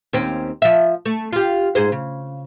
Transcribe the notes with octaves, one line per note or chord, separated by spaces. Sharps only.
D#2 C4 C#4
F3 E5
A3
F4 G4
G#2 G#4 C5
C#3